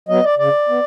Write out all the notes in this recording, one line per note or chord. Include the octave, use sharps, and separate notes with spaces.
F#3 B3 D#5
D5
C#3 D5
B3